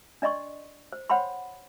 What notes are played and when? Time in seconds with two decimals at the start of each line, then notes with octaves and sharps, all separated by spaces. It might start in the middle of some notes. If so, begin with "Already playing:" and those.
0.22 D4 D5 D#5 C6 C#6
0.92 C5
1.10 C5 C#5 F#5 G5 B5 C6